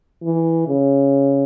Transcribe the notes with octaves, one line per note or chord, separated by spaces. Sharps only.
E3
C#3